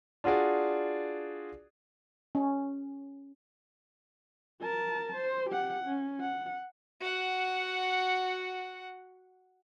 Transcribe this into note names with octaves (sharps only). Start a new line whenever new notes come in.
D4 F4 F#4 G#4 D5
C#4
A#4 A5
C5
G4 F#5
C#4
F#5
F#4 F#5